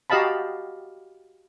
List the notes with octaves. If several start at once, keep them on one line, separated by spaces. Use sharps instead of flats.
F#4 G4 D#5 F5 A5 B5